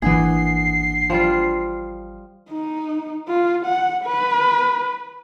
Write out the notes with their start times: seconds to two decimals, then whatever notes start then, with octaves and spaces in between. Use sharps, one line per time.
0.02 G#1 E3 A#3 D4 G#4 F#5 C7
1.10 F3 G3 F4
2.50 D#4
3.28 F4
3.66 F#5
4.04 B4